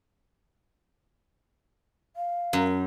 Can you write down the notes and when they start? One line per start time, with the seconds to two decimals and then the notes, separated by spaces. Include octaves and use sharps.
2.16 F5
2.53 F#2